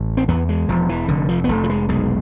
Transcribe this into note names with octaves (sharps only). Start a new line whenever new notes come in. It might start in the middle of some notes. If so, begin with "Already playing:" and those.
Already playing: A1
C4
E2 B3
G#3
E1 F3
E3
F1 D3
F3
B3
F1 A3
F3
G#3
B1 G#3